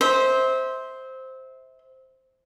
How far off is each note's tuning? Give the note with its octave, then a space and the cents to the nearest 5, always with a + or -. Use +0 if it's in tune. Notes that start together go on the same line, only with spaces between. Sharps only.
C5 +0 E5 -30